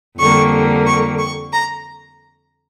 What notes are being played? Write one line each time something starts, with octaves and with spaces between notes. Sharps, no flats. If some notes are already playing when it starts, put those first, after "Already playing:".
F2 D3 G3 A#3 C#6
C#6
C#6
A#5